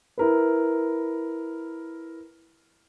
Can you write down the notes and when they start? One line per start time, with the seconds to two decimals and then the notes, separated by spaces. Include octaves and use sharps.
0.18 E4 A#4 B4